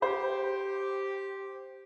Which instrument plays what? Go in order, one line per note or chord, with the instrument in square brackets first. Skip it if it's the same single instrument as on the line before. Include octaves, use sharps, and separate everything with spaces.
[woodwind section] G4 [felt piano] C5